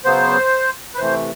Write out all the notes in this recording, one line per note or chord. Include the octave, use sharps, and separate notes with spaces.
C#3 F#3 B3 C5
B4
C3 E3 A3 C5